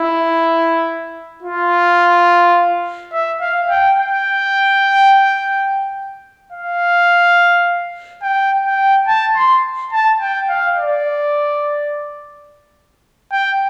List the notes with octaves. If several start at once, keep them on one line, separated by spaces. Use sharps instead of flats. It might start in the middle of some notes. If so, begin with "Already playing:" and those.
Already playing: E4
F4
E5
F5
G5
G5
F5
G5
G5
A5
C6
A5
G5
F5
D5
G5